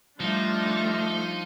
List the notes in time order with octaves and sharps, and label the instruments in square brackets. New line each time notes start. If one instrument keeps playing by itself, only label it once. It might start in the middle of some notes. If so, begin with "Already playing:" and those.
[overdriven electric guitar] F3 [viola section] G3 D4 C5 [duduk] A3 [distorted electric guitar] D#4